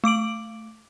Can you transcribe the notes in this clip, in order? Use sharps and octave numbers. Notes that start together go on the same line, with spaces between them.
A3 D6 D7 F#7